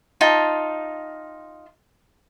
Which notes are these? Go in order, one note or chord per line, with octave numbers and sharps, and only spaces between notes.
D#4 F4 G5 A5